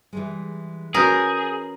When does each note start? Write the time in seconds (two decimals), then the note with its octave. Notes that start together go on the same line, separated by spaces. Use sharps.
0.13 E3 G3 G#3
0.94 C#4 F#4 G#4 A#4 B4 D#6 G6